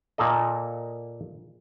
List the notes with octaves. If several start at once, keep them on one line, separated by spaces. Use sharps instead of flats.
A#2 A#3 A4 D#5